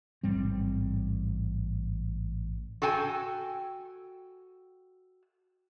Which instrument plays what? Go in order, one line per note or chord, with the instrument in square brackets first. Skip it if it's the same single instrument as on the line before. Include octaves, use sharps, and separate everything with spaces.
[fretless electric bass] A1 G#2 G3 C4
[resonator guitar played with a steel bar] F#4 A4 G5 G#5